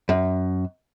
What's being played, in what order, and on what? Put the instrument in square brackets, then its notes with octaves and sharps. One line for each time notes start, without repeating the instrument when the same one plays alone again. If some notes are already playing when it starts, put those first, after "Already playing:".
[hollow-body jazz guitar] F#2